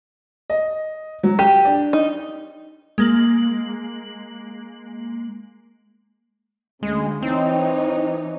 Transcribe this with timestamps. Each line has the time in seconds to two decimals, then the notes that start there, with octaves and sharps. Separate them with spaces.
0.50 D#5
1.23 F#3
1.39 G4 D#7
1.65 D4
1.93 D#4
2.98 G#3 A#3 F#7
6.83 D2 C#3 G#3
7.22 E3 C4 D#4 C#5